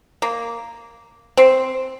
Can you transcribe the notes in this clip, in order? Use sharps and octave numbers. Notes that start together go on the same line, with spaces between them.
A#3
C4